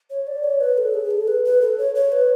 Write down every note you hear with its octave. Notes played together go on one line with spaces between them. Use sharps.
C#5
D5
C#5
B4
A4
G#4
A4
B4
B4
A4
C#5
C#5
B4